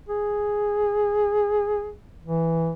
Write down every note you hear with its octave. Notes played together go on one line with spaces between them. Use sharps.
G#4
E3